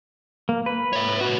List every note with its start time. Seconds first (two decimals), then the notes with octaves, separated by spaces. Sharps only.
0.49 A#3
0.66 B4
0.93 C#5 E5
1.21 A#2 F#4